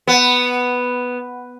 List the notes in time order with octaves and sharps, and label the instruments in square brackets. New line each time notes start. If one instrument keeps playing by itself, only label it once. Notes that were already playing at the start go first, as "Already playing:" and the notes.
[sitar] B3